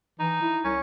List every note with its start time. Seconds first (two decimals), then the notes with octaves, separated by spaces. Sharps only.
0.19 E3 D#4
0.42 E4
0.64 C2 C#4